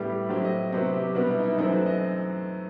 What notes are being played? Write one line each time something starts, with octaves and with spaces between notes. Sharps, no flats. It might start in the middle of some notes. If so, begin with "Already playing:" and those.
Already playing: A2 G3 B3 G4
A2 F#3 C4 G4
D#5
C3 F#3 B3 C5
G4
B2 G3 B3 F#4
E4
D#4
E4
F#2 E3 A3 C4 D#4
F#4
D#5